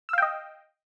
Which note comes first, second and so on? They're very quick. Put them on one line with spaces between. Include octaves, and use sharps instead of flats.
E6 F5 G5 D#5